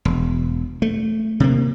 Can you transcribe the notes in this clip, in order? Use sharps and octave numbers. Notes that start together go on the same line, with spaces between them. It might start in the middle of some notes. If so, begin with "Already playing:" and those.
E1
A3
C3 A#3